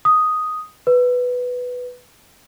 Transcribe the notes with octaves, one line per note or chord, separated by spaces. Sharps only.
D#6
B4